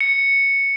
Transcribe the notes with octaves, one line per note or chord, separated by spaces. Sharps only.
C#7